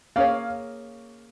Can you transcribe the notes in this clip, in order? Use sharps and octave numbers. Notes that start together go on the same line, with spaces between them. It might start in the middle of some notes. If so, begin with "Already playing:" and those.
A#3 C#4 G#4 C#5 F5